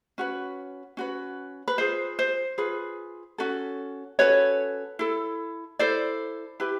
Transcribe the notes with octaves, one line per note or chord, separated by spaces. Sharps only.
C#4 F#4 B4
C#4 F#4 B4
B4
F4 G#4 B4 C5
C5
F4 G#4 B4
C#4 F#4 A4
C#4 F#4 A4 B4 C#5
E4 A4
E4 A4 C5 D5
E4 G4 B4